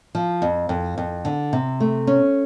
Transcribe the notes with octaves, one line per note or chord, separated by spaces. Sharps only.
F3
F2
F2
F2
D3
C3
A3
C#4